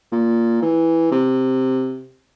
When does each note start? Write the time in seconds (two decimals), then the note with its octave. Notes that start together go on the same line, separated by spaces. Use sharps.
0.12 A#2
0.62 E3
1.11 C3